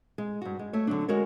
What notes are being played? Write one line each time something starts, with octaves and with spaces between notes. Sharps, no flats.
G#3
G2 F#4
G#3
A3 C#5
D3 F#3 D4
G#3 F#4 A#4 C#5